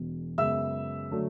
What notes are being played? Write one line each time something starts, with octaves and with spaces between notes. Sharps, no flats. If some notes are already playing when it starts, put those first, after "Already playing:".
Already playing: E1 E2 B2
F#2 C#3 G#3 B3 E5 E6
D3 F#3 A3